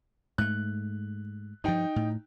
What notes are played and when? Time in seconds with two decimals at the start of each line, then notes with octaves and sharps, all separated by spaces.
0.38 G#2 A3 F#6
1.64 G2 F3 D#4 G5
1.96 A2